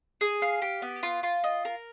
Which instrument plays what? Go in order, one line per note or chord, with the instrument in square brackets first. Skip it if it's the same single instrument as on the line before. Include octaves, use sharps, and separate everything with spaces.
[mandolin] G#4
F5
G4
B3
F4
F4
D#5
A#4